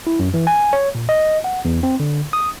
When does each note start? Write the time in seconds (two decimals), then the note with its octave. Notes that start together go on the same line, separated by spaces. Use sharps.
0.07 E4
0.19 F#2
0.34 E3
0.47 G#5
0.73 C#5
0.95 A#2
1.09 D#5
1.44 F#5
1.65 E2
1.83 C4
2.00 D3
2.33 D#6